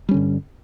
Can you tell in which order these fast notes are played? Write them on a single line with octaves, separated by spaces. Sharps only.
G3 C#4 D3 G2